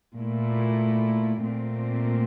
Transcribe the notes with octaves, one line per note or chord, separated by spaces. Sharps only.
A#2 A3 E4
A#2 A3 C4